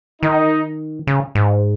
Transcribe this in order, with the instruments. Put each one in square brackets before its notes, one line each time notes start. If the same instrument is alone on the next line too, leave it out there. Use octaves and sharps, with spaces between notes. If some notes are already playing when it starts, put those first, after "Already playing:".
[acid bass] D#3 [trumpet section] D#4
[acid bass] C#3
G#2